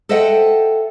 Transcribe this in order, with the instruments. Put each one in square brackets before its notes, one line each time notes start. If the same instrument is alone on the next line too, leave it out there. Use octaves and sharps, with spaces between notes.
[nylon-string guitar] A4 C5 D#5 E5 F#5 G5